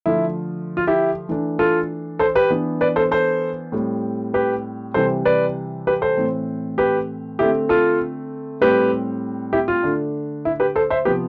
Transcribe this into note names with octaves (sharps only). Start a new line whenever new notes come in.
D3 F3 A3 E4
F4
E4 G4
E3 A3 D4
F4 A4
A4 C5
G4 B4
E3 B3 D4
B4 D5
A4 C5
A4 C5
A2 G3 C4
G4 B4
C3 E3 G3 A4 C5
B4 D5
G4 B4
A4 C5
A2 E3 A3 C4
G4 B4
D3 A3 C4 E4 G4
F4 A4
A2 G3 C4 G4 B4
E4 G4
F4
D3 A3 D4
E4
G4 B4
A4 C5
C5 E5
C3 F3 B3 G4 B4